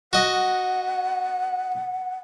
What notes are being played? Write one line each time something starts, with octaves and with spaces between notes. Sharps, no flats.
F#4 D#5 F#5